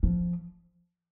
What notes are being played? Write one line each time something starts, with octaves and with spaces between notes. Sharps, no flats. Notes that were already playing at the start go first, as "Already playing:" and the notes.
F3